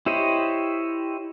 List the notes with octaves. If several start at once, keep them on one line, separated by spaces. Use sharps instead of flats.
E4 G4 C5 C#5 D#5